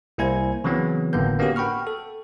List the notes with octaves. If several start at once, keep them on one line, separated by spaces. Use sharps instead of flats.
C2 A#3 E4 C5 G#5 G#6
C#3 E3 F#3 B3 C4
G1 A2 D3 A#3 B3 G6
A#3 B3 C#4 D4 F#4 G4
F#5 G5 B5 C#6 F6
A4